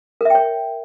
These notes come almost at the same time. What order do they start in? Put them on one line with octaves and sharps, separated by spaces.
A#4 E5 G5 C#5